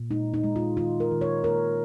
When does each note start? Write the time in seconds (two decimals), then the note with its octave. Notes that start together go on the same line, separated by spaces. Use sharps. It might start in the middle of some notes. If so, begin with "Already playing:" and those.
Already playing: A#2
0.11 G#3 D#4
0.34 D#4
0.44 G#3
0.56 F4
0.77 D#3 F4
1.00 A#4
1.11 D#3
1.21 C#5
1.44 A#3 A#4